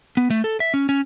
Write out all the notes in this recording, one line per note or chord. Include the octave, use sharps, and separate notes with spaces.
B3
A3
A4
E5
C#4
C#4